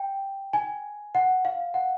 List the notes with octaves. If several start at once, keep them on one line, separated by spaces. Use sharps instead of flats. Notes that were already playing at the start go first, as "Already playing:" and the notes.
Already playing: G5
G#5
F#5
F5
F#5